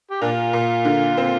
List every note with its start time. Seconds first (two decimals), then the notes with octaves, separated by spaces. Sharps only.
0.11 G4
0.21 A#2 D4 F4
0.53 A#2
0.85 D3
1.17 C4